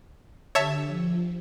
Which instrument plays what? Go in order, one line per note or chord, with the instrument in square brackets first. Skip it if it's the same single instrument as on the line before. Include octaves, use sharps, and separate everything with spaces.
[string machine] D3 G4 E6 [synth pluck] C#5 E5 A5
[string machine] F3